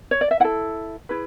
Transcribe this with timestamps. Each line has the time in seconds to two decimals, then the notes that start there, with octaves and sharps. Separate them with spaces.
0.11 C#5
0.21 D5
0.31 E5
0.40 E4 F#5
0.44 A4
1.09 E4 G#4 B4